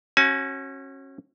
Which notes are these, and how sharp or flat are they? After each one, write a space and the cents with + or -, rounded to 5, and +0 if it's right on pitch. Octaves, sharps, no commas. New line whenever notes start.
C#4 -30 F#4 +10 G#5 +35